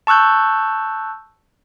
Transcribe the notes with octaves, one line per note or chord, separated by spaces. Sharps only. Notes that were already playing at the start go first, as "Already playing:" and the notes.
A5 C#6 E6 F#6 G6